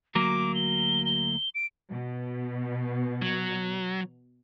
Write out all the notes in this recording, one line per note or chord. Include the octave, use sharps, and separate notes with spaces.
D2 F#3 A#3 D6
G7
G7
D7
B2
F#3